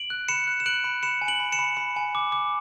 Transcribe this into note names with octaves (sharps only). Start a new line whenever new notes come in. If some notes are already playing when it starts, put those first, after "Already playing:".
Already playing: D7 F#7
F#6
B5 C#7 E7
F#6
E7
F#6 D7 F#7
B5
B5 C#7 E7
G#5
D7 F#7
B5
C#7 E7
B5
B5
G#5
D6
D6